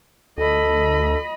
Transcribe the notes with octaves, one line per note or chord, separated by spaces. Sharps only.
D2 A4 D#5 B5